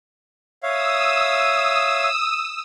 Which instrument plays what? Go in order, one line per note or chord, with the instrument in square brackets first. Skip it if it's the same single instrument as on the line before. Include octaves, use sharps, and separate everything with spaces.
[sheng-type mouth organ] C#5 E5 F5 [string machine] D#6 E6